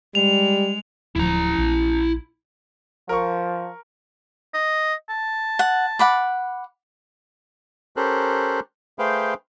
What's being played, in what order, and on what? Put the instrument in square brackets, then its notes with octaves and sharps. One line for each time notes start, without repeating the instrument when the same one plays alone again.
[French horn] G3 [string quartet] G#3 [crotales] F7
[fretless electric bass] D1 F3 [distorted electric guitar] E4 A#5
[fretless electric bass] A#1
[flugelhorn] F3 [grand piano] A#4 C#6
[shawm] D#5
A5
[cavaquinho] F#5
F#5 B5 D6
[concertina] C#4 G4 A4 A#4 C5 F#6
A3 G#4 B4 C5 F5 G5